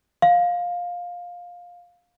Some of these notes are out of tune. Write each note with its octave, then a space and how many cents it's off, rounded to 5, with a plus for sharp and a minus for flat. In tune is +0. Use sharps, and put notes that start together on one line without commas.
F5 +15